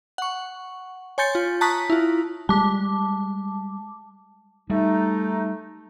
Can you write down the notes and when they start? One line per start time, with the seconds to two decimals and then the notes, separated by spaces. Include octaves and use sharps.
0.18 F#5 C#6
1.18 C#5 G#5 C6 G6 A6 C#7
1.35 F4
1.61 A5 A#5 C#6 D#6 F#6 B6
1.90 E4 F4
2.49 G3 G#3 A5 D6
4.70 G3 A3 D#4